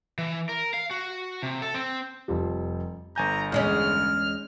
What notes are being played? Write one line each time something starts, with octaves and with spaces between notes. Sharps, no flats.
E3
A#4
F5
F#4
C3
A4
C4
F1 F3 G3
G1 G#5 A#5 G6
E2 G#3 C#4 F6